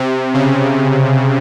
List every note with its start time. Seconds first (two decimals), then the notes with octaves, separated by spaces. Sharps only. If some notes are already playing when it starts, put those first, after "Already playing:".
Already playing: C3
0.34 C#3